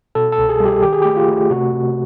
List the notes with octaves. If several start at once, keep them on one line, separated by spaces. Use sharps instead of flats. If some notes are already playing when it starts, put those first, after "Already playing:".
B2 A4
A4
C2
G#4
G3
G4
D#3 G4
G#4
A3 G4
F4
A3
C3 F#4
C3